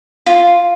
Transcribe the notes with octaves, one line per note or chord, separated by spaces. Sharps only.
F4